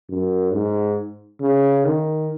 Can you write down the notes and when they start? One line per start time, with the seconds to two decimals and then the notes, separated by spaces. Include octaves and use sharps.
0.10 F#2
0.53 G#2
1.41 C#3
1.85 D#3